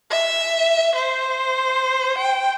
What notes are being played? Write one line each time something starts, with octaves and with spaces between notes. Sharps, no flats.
E5
C5
G5